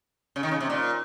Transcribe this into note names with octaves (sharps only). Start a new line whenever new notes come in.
C#3
D#3
C#3
C3
A#2